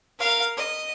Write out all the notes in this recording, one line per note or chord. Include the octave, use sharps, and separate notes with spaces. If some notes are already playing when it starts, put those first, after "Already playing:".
A#4 F5
D#5